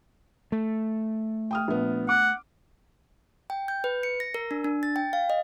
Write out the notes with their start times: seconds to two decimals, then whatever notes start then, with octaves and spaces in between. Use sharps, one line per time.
0.52 A3
1.51 G5 D#6 F6
1.68 A#1 B3
2.09 F#5 D6
3.50 G5
3.68 G6
3.84 B4
4.03 C#7
4.20 A#6
4.34 A#4
4.51 D4
4.64 D4
4.83 A6
4.96 G5
5.13 F5
5.30 D#5